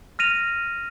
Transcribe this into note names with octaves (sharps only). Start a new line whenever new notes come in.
F6 A#6 D#7 F7